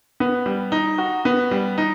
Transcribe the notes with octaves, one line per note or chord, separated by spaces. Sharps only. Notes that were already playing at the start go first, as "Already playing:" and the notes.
B3
G3
D#4
F#4
B3
G3
D#4